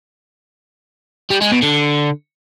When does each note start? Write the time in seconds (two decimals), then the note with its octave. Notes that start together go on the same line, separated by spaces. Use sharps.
1.31 G3
1.41 G#3
1.52 B2
1.63 D3